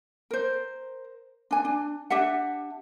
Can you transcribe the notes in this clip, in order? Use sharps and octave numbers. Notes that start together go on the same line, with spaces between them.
A#4 C5
D4 G#5
D4
D4 G4 E5 F#5